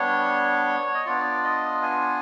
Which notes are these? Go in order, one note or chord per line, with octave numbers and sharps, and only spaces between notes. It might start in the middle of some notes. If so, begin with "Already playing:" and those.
Already playing: G3 B3 D4 C#5
D#5
B3 D4 F4 D5
D#5
G#5